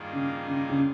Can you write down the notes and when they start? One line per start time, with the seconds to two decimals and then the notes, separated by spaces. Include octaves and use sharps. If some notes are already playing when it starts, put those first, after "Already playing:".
Already playing: G2 D#3 A#3 F4 G#4
0.13 C#3
0.47 C#3
0.70 C#3